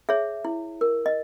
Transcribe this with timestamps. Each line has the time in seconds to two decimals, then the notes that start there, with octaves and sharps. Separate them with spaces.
0.09 G#4 C#5 E5
0.45 E4
0.81 A#4
1.06 D#5